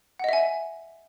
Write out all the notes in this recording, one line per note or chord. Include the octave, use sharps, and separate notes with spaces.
D#5 E5 F#5 G#5